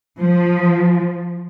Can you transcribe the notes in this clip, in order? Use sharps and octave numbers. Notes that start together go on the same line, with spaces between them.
F3